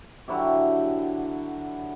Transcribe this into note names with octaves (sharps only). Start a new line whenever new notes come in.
D3 F#3 E4 G4